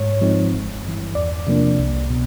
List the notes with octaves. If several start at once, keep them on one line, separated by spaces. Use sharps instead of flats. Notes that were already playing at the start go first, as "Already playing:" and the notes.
Already playing: G#2 C#5
F3 G#3 C4 D#4
G1
G2 E3
E2 D5
C3 F3 A#3 D4
C2
B2